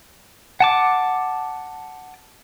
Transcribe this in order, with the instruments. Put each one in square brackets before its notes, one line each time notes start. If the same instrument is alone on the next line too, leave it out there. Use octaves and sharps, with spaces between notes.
[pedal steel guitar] F#5 A5 D6